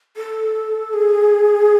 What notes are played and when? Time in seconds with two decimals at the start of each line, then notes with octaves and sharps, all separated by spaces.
0.17 A4
0.93 G#4